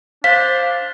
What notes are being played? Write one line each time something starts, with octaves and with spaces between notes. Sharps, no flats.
D4 C5 F5 B6